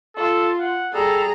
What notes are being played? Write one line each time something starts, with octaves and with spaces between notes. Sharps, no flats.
F4 A4
F#5
G3 G#4 A4 A#5